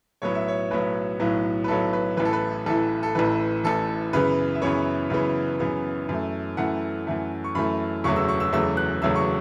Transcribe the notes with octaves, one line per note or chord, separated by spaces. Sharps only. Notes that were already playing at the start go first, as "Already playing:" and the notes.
B1 A2 F#3 B3 C#5
E5
C#5
B1 A2 F#3 B3 B4
B1 A2 F#3 B3
B4
B1 A2 F#3 B3 A4
B4
A1 A2 E3 B4
A4
B4
A1 A2 E3 A4
A4
A1 A2 E3 B4
A1 A2 E3 A4
F#2 C#3 E3 B3 B4
E5
F#2 C#3 E3 B3 C#5
F#2 C#3 E3 B3
F#2 C#3 E3 B3
F#2 E3 A3
F#2 E3 A3 F#5
F#2 E3 A3
C#6
F#2 E3 A3 B5
E1 E2 C#3 F#3 A3 C#6
E6
C#6
E6
E1 E2 C#3 F#3 A3 E6
F#6
E1 E2 C#3 F#3 A3 E6
C#6